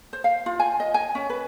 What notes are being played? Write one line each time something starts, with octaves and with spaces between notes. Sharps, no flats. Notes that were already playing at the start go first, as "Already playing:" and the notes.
C5
F5
F4
G#5
D#5
G#5
C#4
B4